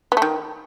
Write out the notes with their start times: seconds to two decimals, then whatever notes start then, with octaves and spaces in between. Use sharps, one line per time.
0.12 B3
0.17 A3
0.22 D#3